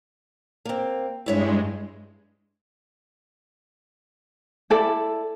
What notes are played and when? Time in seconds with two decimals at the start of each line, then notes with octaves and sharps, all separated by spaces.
0.65 A#3 C4
1.26 G2 G#3 E4 C#5 E5
4.70 E4 A4 D5